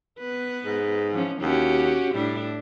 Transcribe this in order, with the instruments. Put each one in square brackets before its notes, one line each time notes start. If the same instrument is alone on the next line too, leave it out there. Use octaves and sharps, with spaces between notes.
[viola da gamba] B3 B4
[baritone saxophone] G#2
[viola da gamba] E3 F3 C#4
[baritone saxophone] D#2 [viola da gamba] C#4 F#4 G4
[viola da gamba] A2 D4 E4 [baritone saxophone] G3